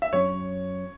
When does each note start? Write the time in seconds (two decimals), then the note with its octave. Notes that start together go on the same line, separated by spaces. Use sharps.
0.02 E5
0.12 F#2 F#3 A3 C#4 C#5